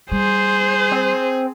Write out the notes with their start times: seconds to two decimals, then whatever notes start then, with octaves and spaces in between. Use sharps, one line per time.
0.12 G3 G#4 C5
0.91 C4